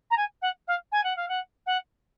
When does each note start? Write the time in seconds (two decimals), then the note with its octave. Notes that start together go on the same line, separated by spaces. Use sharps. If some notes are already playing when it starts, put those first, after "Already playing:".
0.10 A#5
0.17 G#5
0.41 F#5
0.67 F5
0.92 G#5
1.03 F#5
1.16 F5
1.28 F#5
1.66 F#5